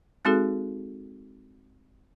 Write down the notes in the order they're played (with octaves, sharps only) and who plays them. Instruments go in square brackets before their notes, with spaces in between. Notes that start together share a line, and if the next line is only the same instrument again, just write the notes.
[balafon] G#3 C4 D#4 F#4 G#4 A4